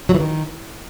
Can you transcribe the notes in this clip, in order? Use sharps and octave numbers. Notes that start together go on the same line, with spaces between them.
F#3
E3
D#3